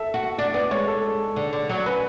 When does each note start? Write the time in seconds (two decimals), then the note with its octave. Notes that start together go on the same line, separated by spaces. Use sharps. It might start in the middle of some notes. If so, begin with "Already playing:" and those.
Already playing: A4 E5
0.14 F#4
0.38 D4 D5
0.54 B3 D5
0.71 G#3 C#5
0.88 A4
1.36 D3
1.53 D3
1.69 F#3
1.86 C#4 B4